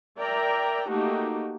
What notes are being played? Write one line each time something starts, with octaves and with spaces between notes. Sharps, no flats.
A#4 D5 E5 G5 A#5
A3 A#3 D#4 F#4 G4